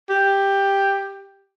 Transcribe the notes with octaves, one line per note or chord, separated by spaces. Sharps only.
G4